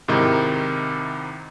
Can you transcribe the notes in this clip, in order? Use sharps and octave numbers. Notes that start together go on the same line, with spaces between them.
G#2 C3 D#3 D#4 E4